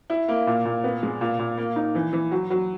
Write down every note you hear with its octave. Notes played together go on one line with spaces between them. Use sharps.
E4
A#3
A#2
A#2
B3
G#3
A#2
A#2
A#3
D#4
E3
E3
F#3
F#3